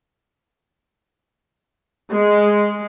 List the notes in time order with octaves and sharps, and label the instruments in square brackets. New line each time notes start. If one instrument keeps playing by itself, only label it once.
[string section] G#3